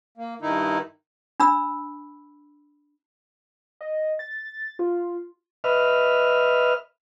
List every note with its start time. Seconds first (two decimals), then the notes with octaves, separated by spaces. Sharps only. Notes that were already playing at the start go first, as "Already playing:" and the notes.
0.18 A#3
0.42 G2 D#3 D#4 E4
1.40 D4 B5 E6
3.81 D#5
4.19 A6
4.79 F4
5.64 B4 D#5 E5 F6